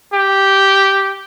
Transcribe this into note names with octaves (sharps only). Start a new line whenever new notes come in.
G4